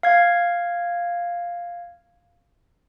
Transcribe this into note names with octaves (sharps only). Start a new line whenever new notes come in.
F5 G#6